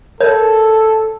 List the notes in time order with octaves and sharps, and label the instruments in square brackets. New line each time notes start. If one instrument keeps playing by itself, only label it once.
[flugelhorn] A4 [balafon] A#4 [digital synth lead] C#5